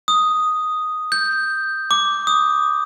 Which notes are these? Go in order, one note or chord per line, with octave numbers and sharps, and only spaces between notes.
D#6
G6
D6
D#6